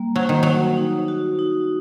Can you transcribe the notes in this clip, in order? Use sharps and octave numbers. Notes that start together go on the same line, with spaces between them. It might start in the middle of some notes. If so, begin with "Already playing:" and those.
Already playing: G3 A#3
F#3 C5
D#3
F#3 F#4
D#4
F#4
D#4